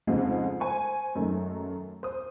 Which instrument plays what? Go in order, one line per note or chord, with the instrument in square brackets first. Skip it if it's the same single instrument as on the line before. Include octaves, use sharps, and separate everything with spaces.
[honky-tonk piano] F2 G#2 C#3 G#3 A3 C4
C5 G#5 C#6
F#2 D#3 G#3 A3
C5 D#6